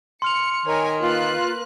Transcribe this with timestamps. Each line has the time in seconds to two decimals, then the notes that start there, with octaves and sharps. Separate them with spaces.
0.22 C6 F6 C#7 F7
0.66 D#3 A#4 C#5 G#5
1.00 A#3 F4 B4 F#6